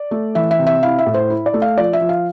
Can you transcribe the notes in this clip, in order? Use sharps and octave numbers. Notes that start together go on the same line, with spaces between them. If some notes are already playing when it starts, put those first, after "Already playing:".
Already playing: D5
A3
E3 E5
E5
C3
E5
E4 F5
E5
A2
C5
E4
D5
A3
F5
F3 D5
E5
F3
F5